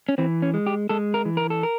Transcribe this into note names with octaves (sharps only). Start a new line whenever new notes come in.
C#4
E3 C4
C#4
G#3
G4
G#3 A4
A#4
E3
A#4
A4
A#4